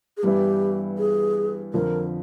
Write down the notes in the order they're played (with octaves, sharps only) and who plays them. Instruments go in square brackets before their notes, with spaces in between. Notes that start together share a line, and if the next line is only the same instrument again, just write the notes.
[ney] G#4
[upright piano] G2 E3 G3 B3 E4 [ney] G4
[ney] G#4
[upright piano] F2 D3 F3 [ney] A#4